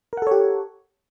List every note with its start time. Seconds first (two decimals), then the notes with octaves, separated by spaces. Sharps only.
0.13 A#4
0.17 F#5
0.22 A4
0.27 C#5
0.31 G4